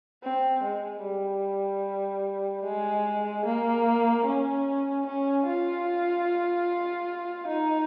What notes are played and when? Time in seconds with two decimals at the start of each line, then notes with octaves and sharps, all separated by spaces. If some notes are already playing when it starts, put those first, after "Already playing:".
0.23 C4
0.63 G#3
1.03 G3
2.64 G#3
3.45 A#3
4.25 C#4
5.07 C#4
5.46 F4
7.48 D#4